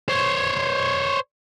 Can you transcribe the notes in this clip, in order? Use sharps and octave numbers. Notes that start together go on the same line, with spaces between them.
C5 C#5